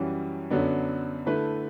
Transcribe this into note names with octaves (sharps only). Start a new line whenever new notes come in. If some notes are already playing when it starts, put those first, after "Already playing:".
Already playing: F#2 E3 G3 C#4 F#4
F#2 D3 F#3 B3 D4
D3 A3 E4 B4